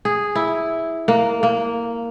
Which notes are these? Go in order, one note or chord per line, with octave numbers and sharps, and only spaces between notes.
G#4
E4
A#3
A#3